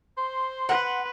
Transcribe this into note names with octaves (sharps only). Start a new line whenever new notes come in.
C5 C6
B4 F#5